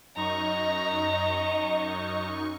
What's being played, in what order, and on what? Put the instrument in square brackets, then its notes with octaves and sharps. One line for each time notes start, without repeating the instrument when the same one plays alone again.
[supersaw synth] F#2 D#4 C#6 [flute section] D#5 [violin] A#5